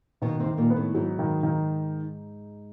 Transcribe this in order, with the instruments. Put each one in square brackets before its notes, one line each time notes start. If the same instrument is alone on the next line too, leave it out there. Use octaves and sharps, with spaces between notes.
[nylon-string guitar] B2 B3 [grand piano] D#3
[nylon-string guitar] C3 C4
[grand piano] D#3
[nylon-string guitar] A#2 A#3
[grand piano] B3
[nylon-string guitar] A2 A3
[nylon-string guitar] G#2 G#3 [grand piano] F#3
[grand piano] D#3
D#3